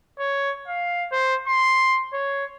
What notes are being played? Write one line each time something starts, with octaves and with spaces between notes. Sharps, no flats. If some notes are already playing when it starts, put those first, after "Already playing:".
C#5
F5
C5
C6
C#5